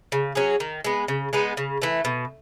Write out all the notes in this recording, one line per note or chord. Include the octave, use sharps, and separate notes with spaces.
C#3
F#3 C#4 G#4
D#3
G#3 B3
C#3
G#3 B3 D#4
C#3
E3 A3
B2